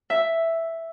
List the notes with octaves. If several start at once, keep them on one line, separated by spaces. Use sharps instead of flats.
E5